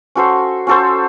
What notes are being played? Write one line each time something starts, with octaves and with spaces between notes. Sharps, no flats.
C#4 F#4 A4 C5
C#4 F#4 A4 C5